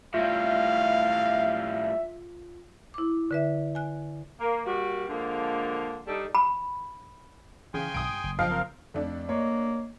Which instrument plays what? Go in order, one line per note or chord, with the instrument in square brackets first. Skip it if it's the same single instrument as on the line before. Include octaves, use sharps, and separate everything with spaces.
[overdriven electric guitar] A2 G3 [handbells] F4 [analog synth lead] E5 [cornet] F5
[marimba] E4 D6
D3 B4 E5
G#5 F#6
[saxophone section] A#3
G3 A#3 F#4
D3 F3 G#3 A#3
G3 D4 D#4 A4
[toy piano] B5
[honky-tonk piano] C#3 [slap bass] E3 [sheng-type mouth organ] G5 G#5 C6
[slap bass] B1 D#3 [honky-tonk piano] D#6 D7
[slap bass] G2
F#1
[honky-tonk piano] F3 F5 F6 [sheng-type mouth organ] D#5 G5
[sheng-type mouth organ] C4 A#4
[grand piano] F2 [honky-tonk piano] A3 D4
[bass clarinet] A#3 [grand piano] C#5 D#5